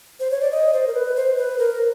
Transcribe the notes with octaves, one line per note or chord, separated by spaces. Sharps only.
C5
C#5
D5
D#5
C5
A#4
B4
C5
B4
A#4